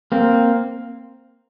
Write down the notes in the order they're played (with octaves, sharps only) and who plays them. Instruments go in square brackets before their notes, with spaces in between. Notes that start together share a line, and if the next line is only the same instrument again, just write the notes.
[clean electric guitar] A#3 C4